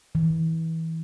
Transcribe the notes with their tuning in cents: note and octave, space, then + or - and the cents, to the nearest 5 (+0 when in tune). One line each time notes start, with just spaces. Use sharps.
E3 -25